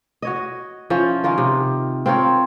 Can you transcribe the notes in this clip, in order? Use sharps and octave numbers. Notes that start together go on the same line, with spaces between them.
F#4 C#5 D#5
F3 C#4 E4
D#3 C#4 F4 A#4
C3
C4 F4 A#4 C#5